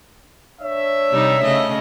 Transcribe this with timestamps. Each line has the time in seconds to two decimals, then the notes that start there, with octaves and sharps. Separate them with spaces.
0.62 D4 C#5 E5
1.11 C3 G3 D#4
1.43 C#3 A3 D#5